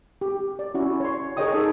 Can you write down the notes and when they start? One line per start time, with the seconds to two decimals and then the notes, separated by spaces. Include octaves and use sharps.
0.21 G4
0.59 D5
0.75 C#4 E4 F#4
1.00 C#5 C6
1.37 G#4 A#4 C#5 D#5 G5 D#6
1.54 D#4 A4